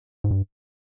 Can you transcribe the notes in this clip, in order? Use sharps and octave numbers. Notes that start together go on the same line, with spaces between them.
G#2
G2